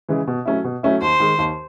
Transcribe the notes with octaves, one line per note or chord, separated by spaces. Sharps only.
C#3 E3 G#3
B2
F#3 A3 C#4 E4
B2
F#3 A3 C#4 E4
D#2 C5
D#3 G#3
D#2